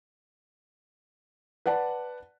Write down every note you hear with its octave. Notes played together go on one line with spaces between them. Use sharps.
B4 D5 F#5 A5